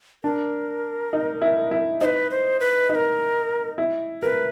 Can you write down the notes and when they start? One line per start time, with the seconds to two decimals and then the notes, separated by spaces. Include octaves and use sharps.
0.24 D4 A#4
1.13 D#4
1.42 E4
1.71 E4
2.01 D#4 B4 C5
2.31 C5
2.60 B4
2.89 D#4 B4
2.95 A#4
3.78 E4
4.22 A#4 B4